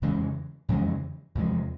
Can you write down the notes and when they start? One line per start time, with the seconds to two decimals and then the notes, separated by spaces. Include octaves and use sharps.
0.02 F2 C#3 E3 G#3
0.69 F2 C#3 E3 G#3
1.35 E2 C3 F3 G#3